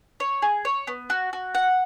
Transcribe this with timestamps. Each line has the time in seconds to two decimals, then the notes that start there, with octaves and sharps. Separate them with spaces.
0.20 C#5
0.42 G#4
0.65 C#5
0.87 B3
1.10 F#4
1.33 F#4
1.55 F#5